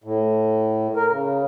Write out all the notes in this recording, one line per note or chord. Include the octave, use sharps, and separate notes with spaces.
A2
A#4
C#3